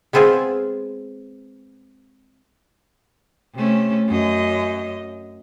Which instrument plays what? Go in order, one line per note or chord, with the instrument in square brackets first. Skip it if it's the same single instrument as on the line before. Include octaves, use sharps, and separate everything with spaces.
[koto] G#3 B3 C4 F4 G#4
[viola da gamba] C3 A3 C#4
F#2 D#5